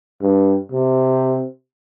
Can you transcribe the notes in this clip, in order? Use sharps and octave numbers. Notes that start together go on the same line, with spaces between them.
G2
C3